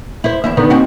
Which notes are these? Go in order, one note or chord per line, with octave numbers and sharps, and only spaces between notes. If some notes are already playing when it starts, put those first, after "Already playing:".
E4 C5
E2 E4 E5
D3 D#3 B3
D#2 C4 F#4